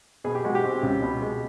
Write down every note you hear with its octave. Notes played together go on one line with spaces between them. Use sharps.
B2 G#4
G4
G#3 F#4
G4
C4
C#2
B2
G#3